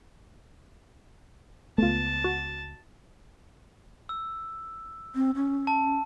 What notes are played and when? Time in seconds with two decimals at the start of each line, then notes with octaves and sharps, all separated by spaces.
1.78 C#2 A3 B3 F4 A5
2.24 F#4
4.09 E6
5.15 C4
5.35 C#4
5.67 A5